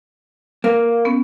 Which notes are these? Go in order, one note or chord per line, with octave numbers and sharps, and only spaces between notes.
A#3 B4 F5 A#6
B3 C#4